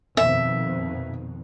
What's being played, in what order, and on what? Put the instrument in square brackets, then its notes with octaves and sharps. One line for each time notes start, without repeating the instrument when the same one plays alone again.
[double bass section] F2 B2 D#3 [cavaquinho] E5